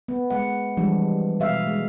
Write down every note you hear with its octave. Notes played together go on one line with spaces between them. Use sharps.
B3
G#3 F#5
E3 F3 G3 G#3 D4
B2 E5 F5
G#3